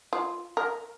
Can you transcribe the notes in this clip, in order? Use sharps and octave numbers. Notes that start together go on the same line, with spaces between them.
F4
A#4